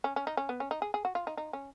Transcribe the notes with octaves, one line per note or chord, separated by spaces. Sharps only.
C#4
C#4
D#4
C#4
B3
C#4
D#4
G#4
G#4
F#4
F4
D#4
D#4
C#4